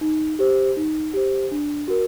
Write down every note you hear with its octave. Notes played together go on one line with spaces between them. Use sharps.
D#4
G4 C5
D#4
G4 C5
D4
F#4 A#4